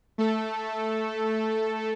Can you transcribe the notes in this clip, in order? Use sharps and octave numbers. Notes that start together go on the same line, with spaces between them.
A3 A4